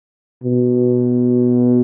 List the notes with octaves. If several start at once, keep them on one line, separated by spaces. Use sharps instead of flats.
B2